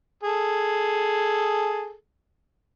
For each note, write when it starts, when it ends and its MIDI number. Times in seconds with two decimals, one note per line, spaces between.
0.23 1.93 68
0.23 1.93 69